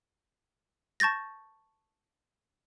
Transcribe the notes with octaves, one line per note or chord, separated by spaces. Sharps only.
A5 C#6 G6 A6 A#6